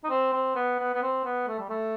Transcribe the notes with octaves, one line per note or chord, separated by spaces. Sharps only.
D#4
C4
C4
B3
B3
B3
C4
B3
A3
G3
A3